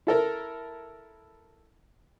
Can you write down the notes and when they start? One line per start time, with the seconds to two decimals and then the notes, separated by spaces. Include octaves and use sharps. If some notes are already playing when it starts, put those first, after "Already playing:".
0.07 E4 A4 A#4